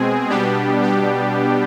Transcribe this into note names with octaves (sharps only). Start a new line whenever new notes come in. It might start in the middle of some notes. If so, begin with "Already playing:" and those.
Already playing: B2 G#3 C4 G#4
B2 G3 B3 D4 G4
G4